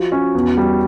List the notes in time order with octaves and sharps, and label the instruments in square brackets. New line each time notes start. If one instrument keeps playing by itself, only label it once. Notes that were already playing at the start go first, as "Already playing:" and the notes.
Already playing: [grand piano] F3 [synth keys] F#4
[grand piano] C#4
E2
G3